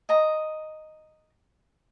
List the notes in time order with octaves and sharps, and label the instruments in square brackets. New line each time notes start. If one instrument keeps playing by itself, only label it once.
[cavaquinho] D#5 A#5